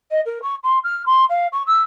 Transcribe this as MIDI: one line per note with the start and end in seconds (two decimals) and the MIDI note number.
0.11 0.20 75
0.26 0.42 70
0.42 0.55 85
0.64 0.79 84
0.84 1.05 89
1.06 1.25 84
1.30 1.47 77
1.52 1.63 85
1.67 1.81 88